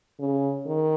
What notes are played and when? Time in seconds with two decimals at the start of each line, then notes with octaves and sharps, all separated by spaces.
0.20 C#3
0.66 D#3